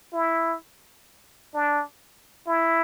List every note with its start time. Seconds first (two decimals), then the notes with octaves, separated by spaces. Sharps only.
0.13 E4
1.54 D4
2.47 E4